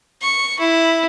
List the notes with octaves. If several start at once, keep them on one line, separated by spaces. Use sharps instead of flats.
C#6
E4